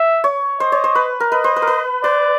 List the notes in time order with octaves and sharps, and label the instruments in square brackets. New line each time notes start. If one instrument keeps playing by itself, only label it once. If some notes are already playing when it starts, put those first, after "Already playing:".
Already playing: [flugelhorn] E5
[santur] C#5
[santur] C5 [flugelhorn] D#5
[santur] C#5
C5
B4
A#4
[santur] B4 [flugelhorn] D#5
[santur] C5
B4
A#4
B4
[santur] B4 [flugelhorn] D5